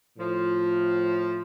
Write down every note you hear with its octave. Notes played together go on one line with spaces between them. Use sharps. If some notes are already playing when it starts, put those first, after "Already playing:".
A2 F3